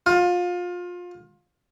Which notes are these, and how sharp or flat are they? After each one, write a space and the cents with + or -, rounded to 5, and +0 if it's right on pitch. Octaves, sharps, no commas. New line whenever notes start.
F4 +25